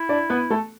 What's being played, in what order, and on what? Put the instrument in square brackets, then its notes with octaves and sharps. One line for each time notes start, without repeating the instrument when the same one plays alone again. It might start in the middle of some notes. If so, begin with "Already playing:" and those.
Already playing: [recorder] E4
[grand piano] D4 D5
B3 B4
A3 A4